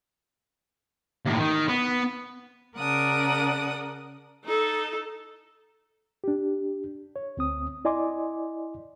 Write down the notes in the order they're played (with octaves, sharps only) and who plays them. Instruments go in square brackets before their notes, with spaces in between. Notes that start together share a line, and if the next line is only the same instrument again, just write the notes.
[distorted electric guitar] D#2 A2
D#3
B3
[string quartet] C#3 A#4 D5 F#5 A5 D#6
[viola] D#4 A4
[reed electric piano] D4 G4
C#5
D2 C4 D#6
E4 D5 D#5 G#5 C6 D6